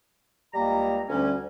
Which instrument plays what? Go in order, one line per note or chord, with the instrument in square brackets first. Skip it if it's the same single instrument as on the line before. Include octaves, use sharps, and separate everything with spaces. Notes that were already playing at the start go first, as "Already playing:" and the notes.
[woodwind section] C#2 A#3 A#5 [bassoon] G3
[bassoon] D2 [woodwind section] G3 C#4